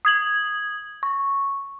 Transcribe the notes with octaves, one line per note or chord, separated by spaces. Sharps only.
D#6 G#6 F#7
C#6